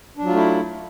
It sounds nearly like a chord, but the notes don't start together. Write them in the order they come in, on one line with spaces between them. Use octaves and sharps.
D4 F#3 F4 A3 E4